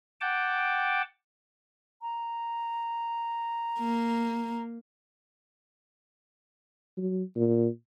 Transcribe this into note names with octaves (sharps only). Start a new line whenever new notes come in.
F#5 G5 A5 D6
A#5
A#3
F#3
A#2